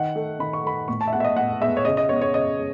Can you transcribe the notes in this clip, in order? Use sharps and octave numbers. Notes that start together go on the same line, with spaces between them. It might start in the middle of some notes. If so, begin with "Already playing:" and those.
Already playing: D#3 F#5
A3
D#3 B5
C#6
A3 B5
A2 C#6
A5
E5
G#3 B3 F#5
E5
D#5
A2 F#5
G#3 B3 E5
C#5
C#3 D#5
D#5
G#3 B3 C#5
C#5
C#3 D#5
G#3